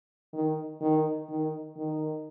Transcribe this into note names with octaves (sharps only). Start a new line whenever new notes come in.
D#3
D#3
D#3
D#3